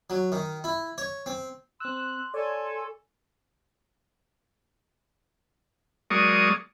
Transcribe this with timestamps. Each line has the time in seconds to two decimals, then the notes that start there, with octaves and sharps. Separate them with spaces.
0.10 F#3
0.32 D#3
0.64 E4
0.98 C#5
1.26 C4
1.80 C4 C6 E6 F#6
2.34 A4 C#5 D5 G#5
6.11 F#3 G#3 A#3 D5 C#6 D#6